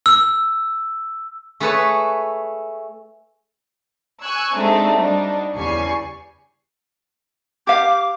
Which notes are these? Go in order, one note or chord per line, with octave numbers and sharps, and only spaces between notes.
E6
A3 G#4 A4 B4 C#5 A5
G#5 C#6 E6 F#6 G#6
G#3 A3 C4 D4 D#4 G4
G3 D4 D#4 F#4
E2 C#3 G3 G#5 C#6 C7
G4 F5 D6